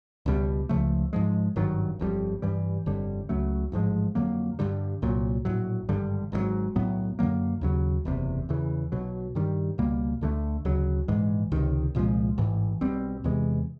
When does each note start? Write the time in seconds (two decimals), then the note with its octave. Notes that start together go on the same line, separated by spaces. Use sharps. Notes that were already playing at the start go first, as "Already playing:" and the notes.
0.26 C#2 B2 G3
0.69 C#2 C#3 F3 A3
1.13 G#2 F3 G#3
1.56 G#1 G2 D#3 F#3
1.99 G1 F2 D3 G3
2.42 G2 E3 G3
2.86 G1 F2 D3 G3
3.29 C#2 C#3 F#3 A3
3.72 A1 G#2 F3 G#3
4.15 F2 D3 F#3 A#3
4.59 G2 D3 G3
5.02 C2 A#2 F#3
5.45 A#1 A2 F#3
5.89 G#1 G2 D3 G3
6.32 G#1 G#2 D#3 F#3
6.75 B1 A2 F#3 B3
7.19 F#2 D3 F#3 A#3
7.61 D#2 C#3 F#3
8.05 F#1 E2 C3
8.49 E2 C#3 E3
8.92 B1 B2 F#3
9.35 G2 D#3 G3
9.78 C#2 B2 G3 A#3
10.21 D2 D3 F3 A3
10.65 D2 C#3 F#3
11.08 A#1 G#2 E3 G#3
11.52 C#2 C3 D#3
11.95 C2 A#2 F3 G#3
12.38 A1 G#2 E3
12.81 B1 B2 G3 C4
13.24 E2 C3 E3 G#3